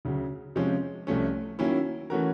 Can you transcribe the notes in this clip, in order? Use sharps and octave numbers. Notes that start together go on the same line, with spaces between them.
D2 C#3 F#3
C3 F3 G#3 C#4 F4
C2 C3 F3 A3 C#4
D#3 F#3 A#3 C#4 E4
E3 A3 C#4 F#4 A#4